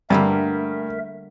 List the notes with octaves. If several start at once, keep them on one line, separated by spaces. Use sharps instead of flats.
G2 D3 G3 A3 A#3 A#4 E5